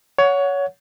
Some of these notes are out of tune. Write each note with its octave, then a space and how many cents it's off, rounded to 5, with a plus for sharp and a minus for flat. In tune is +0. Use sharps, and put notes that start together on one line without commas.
C#5 +20 F#5 -15